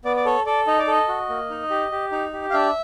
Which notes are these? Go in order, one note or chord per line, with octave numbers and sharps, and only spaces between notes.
B3 D5
D5
A4 C#5
A4 D5
D#4 D#5
D5
A4 D#5
F#4
A#3
D#4
G4
G4
D#4
G4
F5
D4 E5